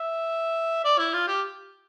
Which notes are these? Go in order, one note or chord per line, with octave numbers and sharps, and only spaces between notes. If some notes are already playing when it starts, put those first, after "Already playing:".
Already playing: E5
D5
E4
F4
G4